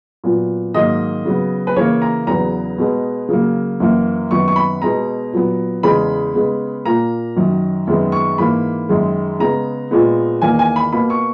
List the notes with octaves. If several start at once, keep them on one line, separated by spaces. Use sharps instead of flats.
A#2 F#3 B3
G#2 D#3 F#3 A#3 D#5
C#3 F#3 B3
B4
C#3 E3 A#3 C#5
A#5
E2 C#3 F#3 B3 A#5
B2 G#3 B3
C#3 F#3 A#3
F#2 E3 A#3
F#2 D#3 F#3 B3 C#6
C#6
B5
B2 G#3 B3 A#5
A#2 F#3 B3
E2 C#3 G#3 B5
C#3 G#3 B3
A#2 A#3 A#5
F#2 D#3 F#3
F#2 D#3 G#3 B3
C#6
G#2 E3 A#3 B5
F#2 D#3 G#3
C#3 G#3 B3 A#5
A#2 G#3 B3
E2 D#3 A#3 G#5
G#5
B5
B2 A#3 B5
C#6